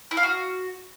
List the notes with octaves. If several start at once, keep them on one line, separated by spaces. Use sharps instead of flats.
E4
F5
F#4